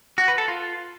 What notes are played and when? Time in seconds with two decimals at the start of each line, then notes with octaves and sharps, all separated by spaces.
0.18 F#4
0.28 B4
0.38 A4
0.48 F4